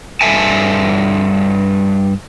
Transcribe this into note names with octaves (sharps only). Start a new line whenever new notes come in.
G2 C#3 A4 E5 G#5 A5